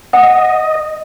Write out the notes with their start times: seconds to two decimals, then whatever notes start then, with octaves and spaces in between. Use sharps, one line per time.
0.13 D#5 F#5